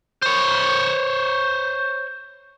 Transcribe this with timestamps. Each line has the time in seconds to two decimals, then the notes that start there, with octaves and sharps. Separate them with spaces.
0.22 C5 C#5